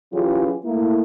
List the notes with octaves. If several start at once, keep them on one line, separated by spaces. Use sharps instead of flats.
E3 F#3 C#4 F4 G4 G#4
A3 A#3 E4